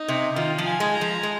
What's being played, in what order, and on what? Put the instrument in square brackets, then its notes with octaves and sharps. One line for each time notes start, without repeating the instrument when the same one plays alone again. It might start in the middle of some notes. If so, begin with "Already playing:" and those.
Already playing: [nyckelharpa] D#4
[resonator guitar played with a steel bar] C3
[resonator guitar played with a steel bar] D#3 [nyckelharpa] F4
[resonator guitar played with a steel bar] F3
[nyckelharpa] G#5
[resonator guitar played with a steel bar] G#3
[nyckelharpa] A#5
[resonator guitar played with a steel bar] F3
G#3